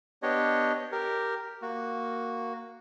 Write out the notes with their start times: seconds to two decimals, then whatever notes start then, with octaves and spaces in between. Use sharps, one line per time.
0.23 B3 D4 G4 C#5 D#5
0.92 G4 A#4
1.62 A#3 F#4